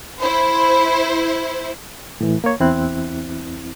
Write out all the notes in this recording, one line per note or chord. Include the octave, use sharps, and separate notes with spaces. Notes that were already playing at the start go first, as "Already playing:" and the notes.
E4 C5 B5
A2 E3
A#3 C#5
E2 C4 E4 F#6